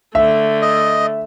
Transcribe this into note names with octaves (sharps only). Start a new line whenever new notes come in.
D3 A3 E5
D#5